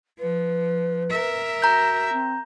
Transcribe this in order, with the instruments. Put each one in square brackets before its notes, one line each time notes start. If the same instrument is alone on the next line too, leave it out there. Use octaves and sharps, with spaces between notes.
[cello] F3 [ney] B4
[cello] A#4 E5
[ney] F#4 [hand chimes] A#5 G6
[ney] C4